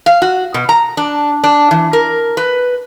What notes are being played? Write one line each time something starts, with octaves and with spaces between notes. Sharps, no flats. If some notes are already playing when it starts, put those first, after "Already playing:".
F5
F#4
B2
A#5
D4
D4
E3
A#4
B4